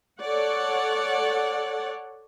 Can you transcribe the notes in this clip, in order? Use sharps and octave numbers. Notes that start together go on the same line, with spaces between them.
A4 C#5 D5 F#5